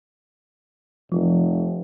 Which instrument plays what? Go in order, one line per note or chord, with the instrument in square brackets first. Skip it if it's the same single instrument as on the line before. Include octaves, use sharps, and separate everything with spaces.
[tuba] F1 [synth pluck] F3